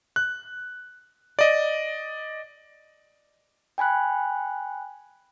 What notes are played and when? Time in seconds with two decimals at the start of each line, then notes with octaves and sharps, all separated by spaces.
0.16 F#6
1.39 D5 D#5
3.78 G5 G#5 B5 F#6